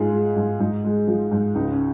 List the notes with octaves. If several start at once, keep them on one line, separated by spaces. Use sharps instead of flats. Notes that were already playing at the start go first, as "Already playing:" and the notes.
Already playing: G#2 G#3 F4 G#4
G#3
G#2
G#2 D#4
G#3
F3
G#2
C#2 D#4
C#4